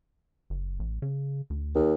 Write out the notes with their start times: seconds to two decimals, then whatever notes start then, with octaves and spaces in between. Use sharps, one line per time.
0.50 F#1
0.79 A1
1.02 C#3
1.50 D2
1.76 D#2